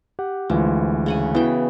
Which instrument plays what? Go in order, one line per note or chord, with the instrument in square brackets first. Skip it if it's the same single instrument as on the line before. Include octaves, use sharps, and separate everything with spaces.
[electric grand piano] G4 F#5
[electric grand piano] D2 E3 G#3 [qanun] F3
[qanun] C#3 F#5 G#5
[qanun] E3 G5 [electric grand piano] B3 F#4